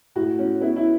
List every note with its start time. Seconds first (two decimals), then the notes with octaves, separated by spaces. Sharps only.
0.16 A2 F#4
0.39 C#4
0.61 B3 E4
0.76 E4